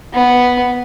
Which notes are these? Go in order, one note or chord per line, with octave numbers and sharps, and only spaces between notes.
B3